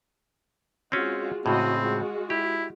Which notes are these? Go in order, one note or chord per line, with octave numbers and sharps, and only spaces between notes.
G#3 C4 C#4 F4 F#4
A2 C#3 G#3 C4 F#4 D#5
G#3 F4 F#4
E4 G4